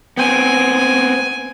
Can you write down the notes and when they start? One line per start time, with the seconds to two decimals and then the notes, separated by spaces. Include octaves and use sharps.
0.17 B3 C4 G#5